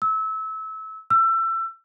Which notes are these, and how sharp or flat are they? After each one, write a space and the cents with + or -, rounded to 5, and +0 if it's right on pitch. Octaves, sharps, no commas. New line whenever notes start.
E6 -25
E6 +25